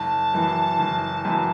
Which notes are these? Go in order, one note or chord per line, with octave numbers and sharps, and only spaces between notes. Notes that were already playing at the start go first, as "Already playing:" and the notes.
Already playing: F#1 A5
F#2 E3
F#1
F#2 E3